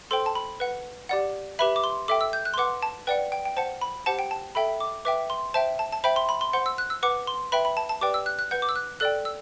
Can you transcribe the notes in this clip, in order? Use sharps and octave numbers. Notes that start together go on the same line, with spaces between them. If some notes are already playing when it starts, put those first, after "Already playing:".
A4 C5 G5 C6
A5
B5
B4 F#5
G4 D5 F#5
G4 B4 E5 B5
D6
C6
A4 E5 G5 D6
E6
G6
F#6
C6
B4 F#5 D6
A5
B4 D5 F#5 G5
G5
G5
C5 F#5 A5
B5
G4 C5 F#5 A5
G5
A5
A4 E5 G5 B5
D6
B4 E5 G5 D6
C6
C5 E5 G5 A5
A5
A5
C5 E5 G5 B5
C6
B5
C6
C5 F#5 C6
E6
F#6
E6
B4 F#5 D6
C6
B4 E5 G5 B5
B5
A5
A5
G4 B4 D5 G5 D6
E6
F#6
F#6
B4 F#5 G6
D6
E6
F#6
A4 D5 G5 F#6
E6